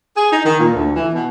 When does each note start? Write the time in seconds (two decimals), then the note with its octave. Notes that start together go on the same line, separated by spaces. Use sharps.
0.16 G#4
0.31 D#4
0.44 D#3
0.59 A#2
0.74 D2
0.95 E3
1.13 B2